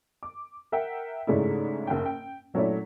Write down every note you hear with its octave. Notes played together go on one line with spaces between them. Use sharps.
D6
A#4 E5 F#5 G5
G#2 C#3 G#3 A3 D4 E4
F#1 F#5 G5
G5
A#2 F#3 A3 C#4 D4 E4